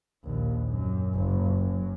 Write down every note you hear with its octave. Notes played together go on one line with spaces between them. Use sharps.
A#1 D#2
F#2
F#1
F#2